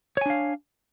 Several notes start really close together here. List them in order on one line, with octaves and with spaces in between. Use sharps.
C#5 G#5 D4 F5